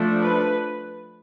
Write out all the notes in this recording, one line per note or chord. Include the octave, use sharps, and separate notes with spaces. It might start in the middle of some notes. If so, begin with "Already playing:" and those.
Already playing: F3 A3 D4
B4